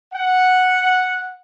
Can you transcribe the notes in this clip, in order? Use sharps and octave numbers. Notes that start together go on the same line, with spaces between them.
F#5